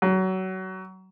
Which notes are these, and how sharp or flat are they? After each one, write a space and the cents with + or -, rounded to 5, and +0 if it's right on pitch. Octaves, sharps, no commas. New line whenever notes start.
F#3 +25